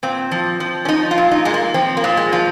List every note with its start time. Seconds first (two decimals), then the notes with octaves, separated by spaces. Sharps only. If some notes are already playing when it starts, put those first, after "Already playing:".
0.03 A#2 C4
0.31 F3
0.60 F3
0.85 C#4
0.88 F3 D#4
1.11 F4
1.18 A#2
1.31 D#4
1.45 A#2 G#3
1.54 A#3
1.74 F3 C4
1.97 A#3
2.04 A#2
2.17 G#3
2.32 F3